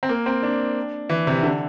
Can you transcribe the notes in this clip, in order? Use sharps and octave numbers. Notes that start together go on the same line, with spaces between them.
C4
A#3
C4
D4
E3
C3
D3